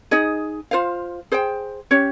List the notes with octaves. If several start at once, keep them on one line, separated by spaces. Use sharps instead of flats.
D#4 G#4 D#5
F4 C5 F5
G#4 C5 G5
C#4 G4 C#5